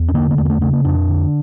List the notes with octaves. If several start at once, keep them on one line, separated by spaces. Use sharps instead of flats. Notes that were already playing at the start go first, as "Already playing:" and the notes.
Already playing: E2
C#4
D3 A#3
A#3
E2 A3
A#3
A3
C#3 A3
A#3
F2 D4
D3